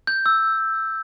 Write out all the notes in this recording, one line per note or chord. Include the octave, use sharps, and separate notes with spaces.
G6
E6